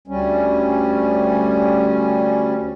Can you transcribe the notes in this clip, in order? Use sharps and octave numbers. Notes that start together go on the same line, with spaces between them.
D2 G3 C#4